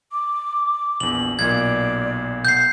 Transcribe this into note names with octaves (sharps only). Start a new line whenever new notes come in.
D6
A#1 E2 F#7
B1 A#2 D5 G#6
F#5 G6 C7